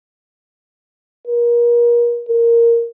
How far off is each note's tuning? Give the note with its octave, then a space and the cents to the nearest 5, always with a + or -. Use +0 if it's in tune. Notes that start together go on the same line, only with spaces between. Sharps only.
A#4 +35
A#4 +0